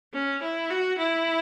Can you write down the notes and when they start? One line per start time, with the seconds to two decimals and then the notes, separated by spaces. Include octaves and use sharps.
0.13 C#4
0.42 E4
0.70 F#4
0.98 E4